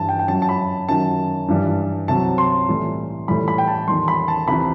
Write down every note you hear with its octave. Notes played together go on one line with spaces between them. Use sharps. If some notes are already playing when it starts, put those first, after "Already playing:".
Already playing: G2 E3 G3 A5
G5
G5
F#2 F#3 A5
A5
B5
F#2 D#3 F#3 A5
G2 E3 G3
C2 C3 F#3 A5
C6
A2 E3 G3
A2 E3 G3 B5
B5
G5
A5
E2 D#3 G3 C6
B5
A5
C2 C3 E3 B5